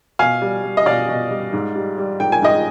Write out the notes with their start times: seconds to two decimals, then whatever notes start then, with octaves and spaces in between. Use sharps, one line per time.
0.19 B2 F5 G#5
0.42 G3
0.63 G3
0.77 D#5
0.86 B2 D5 F5
1.08 B2
1.31 G3
1.53 G#2
1.75 G3
1.98 G3
2.20 G#2 G5
2.32 G#5
2.42 G#2 D#5 G5